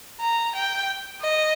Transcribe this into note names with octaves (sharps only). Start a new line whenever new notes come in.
A#5
G5
D#5